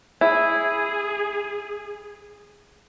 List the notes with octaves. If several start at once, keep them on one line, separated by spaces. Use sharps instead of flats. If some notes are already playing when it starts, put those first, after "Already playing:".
E4 G#4